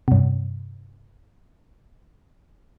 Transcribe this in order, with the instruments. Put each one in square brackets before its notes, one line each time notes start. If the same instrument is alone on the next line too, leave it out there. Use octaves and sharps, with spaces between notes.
[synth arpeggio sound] G2 C3